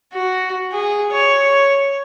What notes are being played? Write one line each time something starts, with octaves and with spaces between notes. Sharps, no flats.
F#4
G#4
C#5